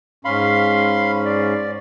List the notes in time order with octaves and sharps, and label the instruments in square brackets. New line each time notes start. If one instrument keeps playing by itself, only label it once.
[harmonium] G#2 C#4 [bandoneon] F5 B5 C6
[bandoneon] D5